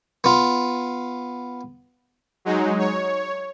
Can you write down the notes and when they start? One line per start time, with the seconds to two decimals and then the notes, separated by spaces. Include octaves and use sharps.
0.24 B3 F4
2.45 F#3 G#3 D#4
2.79 C#5